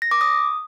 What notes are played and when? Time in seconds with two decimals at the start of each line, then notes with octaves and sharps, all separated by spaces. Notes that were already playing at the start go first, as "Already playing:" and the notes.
0.02 A#6
0.11 D6
0.21 D#6